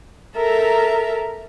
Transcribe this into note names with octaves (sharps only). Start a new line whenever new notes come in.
A4 A#4 E5 A#5